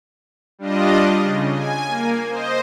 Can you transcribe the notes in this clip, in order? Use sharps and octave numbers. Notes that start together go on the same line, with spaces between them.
G3 D4 F4 D#5
C#3
G#5
A#3
C5 D#5